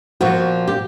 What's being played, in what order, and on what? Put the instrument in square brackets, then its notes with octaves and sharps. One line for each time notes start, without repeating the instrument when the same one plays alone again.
[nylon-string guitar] A#2 F3 [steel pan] F#4
[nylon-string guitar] G4